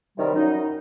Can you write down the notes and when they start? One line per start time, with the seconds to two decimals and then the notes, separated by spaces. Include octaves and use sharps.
0.18 F#2 C3 D#3 E3 G3
0.35 F#2 D#4